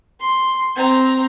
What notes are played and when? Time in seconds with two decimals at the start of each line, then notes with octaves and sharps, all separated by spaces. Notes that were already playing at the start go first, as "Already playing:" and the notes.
0.20 C6
0.75 C4 A#5